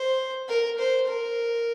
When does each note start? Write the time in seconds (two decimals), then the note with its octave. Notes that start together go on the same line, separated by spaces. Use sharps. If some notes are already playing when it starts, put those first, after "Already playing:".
Already playing: C5
0.49 A#4
0.79 C5
1.07 A#4